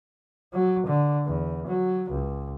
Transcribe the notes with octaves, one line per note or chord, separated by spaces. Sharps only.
F#3
D3
E2
F#3
C#2